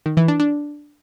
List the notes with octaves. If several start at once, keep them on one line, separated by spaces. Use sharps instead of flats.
D#3
E3
D4
D4